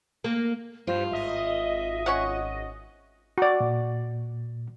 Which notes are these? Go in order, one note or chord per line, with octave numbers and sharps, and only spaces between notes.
A#3
G2 F4 C5
G#1 D#5 E5
C#4 C#5 F#5
F#4 D5
A#2